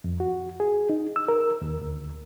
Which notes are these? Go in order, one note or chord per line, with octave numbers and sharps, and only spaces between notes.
F2
F#4
G#4
D#4
E6
A#4
D#2
D2